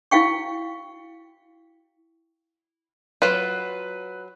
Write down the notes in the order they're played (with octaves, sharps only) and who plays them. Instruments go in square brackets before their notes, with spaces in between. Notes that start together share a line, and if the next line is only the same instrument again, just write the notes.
[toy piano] E4 F#4 F5 G5 C#6
[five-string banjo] F#3 F4 [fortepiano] B4